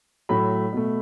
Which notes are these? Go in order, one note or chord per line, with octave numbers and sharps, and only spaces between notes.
A2 F#3 A3 B5
B2 A3